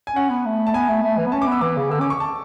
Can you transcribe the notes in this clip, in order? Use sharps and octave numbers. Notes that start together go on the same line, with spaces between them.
G#5
C#4 F#5
B3
A3
A5
B3 G#5
A3
A3
E3
B3
C#4 A5
D6
B3
E6
E3 D6
C#3
D3 E6
C#4 D6
C#6
A5